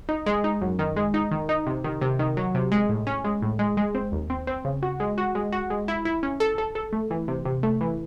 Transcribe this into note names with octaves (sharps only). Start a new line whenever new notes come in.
D#4
G#3
D#4
F#2
D#3
G#3
D#4
D#3
D#4
C3
D#3
C3
D#3
F#3
C3
G#3
A2
C#4
G#3
A2
G#3
G#3
C4
D#2
C4
C4
C#3
F#4
G#3
F#4
G#3
F#4
G#3
E4
E4
C#4
A4
A4
A4
A3
E3
C3
C3
A3
E3